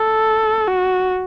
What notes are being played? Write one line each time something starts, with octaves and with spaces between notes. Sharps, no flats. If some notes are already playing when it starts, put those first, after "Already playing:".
Already playing: A4
F#4